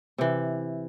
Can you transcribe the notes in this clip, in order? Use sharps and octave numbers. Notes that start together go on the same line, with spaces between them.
C3 E3